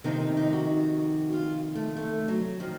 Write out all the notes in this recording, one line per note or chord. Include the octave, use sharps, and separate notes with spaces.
F2 C3 D#3 C4
D#4
D#4
F#4
F4
A3
A3
F#3
D#3 F3